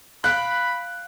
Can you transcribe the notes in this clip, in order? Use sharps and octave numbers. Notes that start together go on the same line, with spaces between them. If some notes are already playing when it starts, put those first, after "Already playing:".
F5 G5 B5 F#6